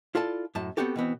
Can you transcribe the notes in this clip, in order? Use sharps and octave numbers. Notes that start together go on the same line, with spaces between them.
E4 F4 A4 D5 A5
F#2 A2 A5
B3 C4 D4 F#4 G4 A4
B2 E3 B3 C4